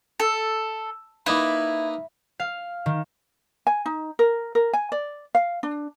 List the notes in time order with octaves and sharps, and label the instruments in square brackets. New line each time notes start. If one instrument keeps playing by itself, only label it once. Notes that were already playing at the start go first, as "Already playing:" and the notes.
[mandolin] A4
[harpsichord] A#3 D#4 B4 [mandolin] E4
[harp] F5
D#3
[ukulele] G#5
D#4
A#4
A#4
G#5
D5
F5
D4